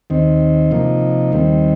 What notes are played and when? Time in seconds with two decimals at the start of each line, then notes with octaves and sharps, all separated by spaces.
0.10 D#2 D#3 C4
0.71 C3 F3 A#3 D#4
1.32 D#2 D#3 G3 C4